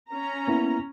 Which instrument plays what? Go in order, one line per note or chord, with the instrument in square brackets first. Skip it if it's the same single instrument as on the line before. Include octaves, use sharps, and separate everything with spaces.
[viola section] C#4 A#5
[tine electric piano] A#3 B3 E4